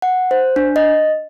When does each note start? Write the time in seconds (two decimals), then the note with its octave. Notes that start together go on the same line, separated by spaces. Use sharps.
0.02 F#5
0.31 C5
0.56 D4
0.76 D#5